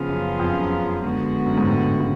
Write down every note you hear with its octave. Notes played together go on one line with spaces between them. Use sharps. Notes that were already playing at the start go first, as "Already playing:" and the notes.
Already playing: C#3 F3 B3 F4 G#4
F#2
F2
F#2
F#2
D3 G#3 B3 F#4
F#2
G#2
A2
C#3